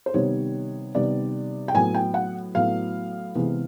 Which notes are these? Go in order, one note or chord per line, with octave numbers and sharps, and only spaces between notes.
C5
C3 D#3 G3 B3 C#5
C3 D#3 G3 B3 D5
G5
A2 F#3 B3 G#5
G5
F#5
A2 F#3 B3 F5
C3 E3 G#3 B3